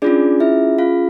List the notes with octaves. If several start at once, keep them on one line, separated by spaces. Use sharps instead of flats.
C#4 D4 F4 G#4 D5
E4 E5
F4 F5